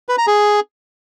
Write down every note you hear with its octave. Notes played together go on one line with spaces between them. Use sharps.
B4
A#5
G#4